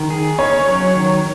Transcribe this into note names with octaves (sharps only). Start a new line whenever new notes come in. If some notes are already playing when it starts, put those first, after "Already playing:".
Already playing: D#3
G#4
C#4 C#5
F#3
D#3